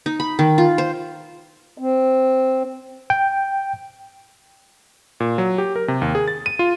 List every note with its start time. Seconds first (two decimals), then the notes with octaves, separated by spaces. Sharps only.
0.06 D#4
0.20 B5
0.39 D#3
0.58 F4
0.78 C5
1.78 C4
3.10 G5
5.20 A#2
5.38 F#3
5.58 G4
5.76 A#4
5.88 C3
6.02 D#2
6.15 G#4
6.28 A6
6.46 D#7
6.59 F4